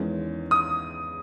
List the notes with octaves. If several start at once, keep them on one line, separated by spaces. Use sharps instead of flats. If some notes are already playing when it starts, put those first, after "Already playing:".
Already playing: E2 D#3 G#3 C#4
D#6